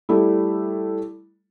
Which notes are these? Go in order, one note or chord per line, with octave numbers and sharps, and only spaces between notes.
G3 A3 E4